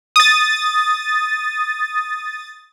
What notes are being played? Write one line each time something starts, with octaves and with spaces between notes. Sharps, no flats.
D#6 A6